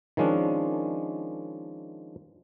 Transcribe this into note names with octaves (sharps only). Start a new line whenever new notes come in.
D#3 F3 G#3 C#4 D4